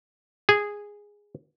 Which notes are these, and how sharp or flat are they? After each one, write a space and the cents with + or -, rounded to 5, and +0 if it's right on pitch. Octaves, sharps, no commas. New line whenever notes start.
G#4 -10